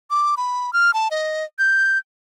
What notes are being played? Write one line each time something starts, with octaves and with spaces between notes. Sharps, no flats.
D6
B5
F6
A5
D#5
G6